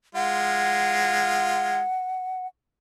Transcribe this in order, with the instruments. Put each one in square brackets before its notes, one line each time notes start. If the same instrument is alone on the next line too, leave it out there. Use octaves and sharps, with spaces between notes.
[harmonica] G#3 F4 [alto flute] F#5